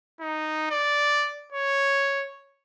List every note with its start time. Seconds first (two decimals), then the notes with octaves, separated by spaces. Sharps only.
0.20 D#4
0.71 D5
1.52 C#5